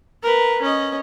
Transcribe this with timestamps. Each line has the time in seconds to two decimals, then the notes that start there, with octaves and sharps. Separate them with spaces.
0.23 A#4 B4
0.62 C#4 D#5